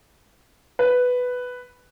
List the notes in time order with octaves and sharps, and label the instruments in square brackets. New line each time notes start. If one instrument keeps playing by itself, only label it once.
[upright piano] B4